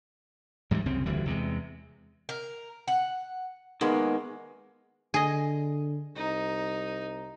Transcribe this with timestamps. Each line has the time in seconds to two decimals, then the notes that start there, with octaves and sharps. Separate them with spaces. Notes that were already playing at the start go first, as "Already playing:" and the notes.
0.71 G#2 E3 F#3 G3
0.86 C2 F#2 C#3 C4
1.06 F1 D2 E3 G3
1.26 E2 C3 F#3 G#3
2.29 A#4
2.88 F#5
3.81 D#3 G#3 A#3 B3
5.14 D3 G#4 D#5
6.15 C2 D#4